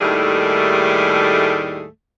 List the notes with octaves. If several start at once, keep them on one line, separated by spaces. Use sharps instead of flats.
D#2 A2 D#3 G3 A3 G#4